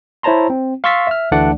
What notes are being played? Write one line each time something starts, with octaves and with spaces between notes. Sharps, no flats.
E4 C5 C#5 A5 A#5 C6
C4
F5 C6 C#6 E6 A6 B6
E5 F6
D2 E3 A3 D4 D5 F#5